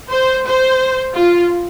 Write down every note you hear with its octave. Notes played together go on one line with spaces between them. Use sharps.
C5
C5
F4